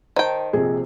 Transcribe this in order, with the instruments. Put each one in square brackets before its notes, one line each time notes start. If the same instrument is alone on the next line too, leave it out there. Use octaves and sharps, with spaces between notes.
[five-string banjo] D#3 G5 [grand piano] C5 A5
[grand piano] A#1 C3 [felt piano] G#4